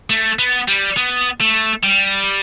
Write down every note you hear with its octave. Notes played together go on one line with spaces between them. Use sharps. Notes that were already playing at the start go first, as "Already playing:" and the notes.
A3
B3
G3
B3
A3
G3